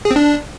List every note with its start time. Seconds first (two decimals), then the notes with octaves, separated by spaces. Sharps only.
0.05 G#4
0.11 C4
0.16 D4